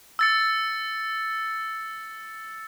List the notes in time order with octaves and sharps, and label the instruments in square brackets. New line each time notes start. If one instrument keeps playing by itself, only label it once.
[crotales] E6 A6 C#7